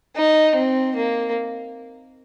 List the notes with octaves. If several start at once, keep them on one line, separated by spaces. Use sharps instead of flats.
D#4
C4
A#3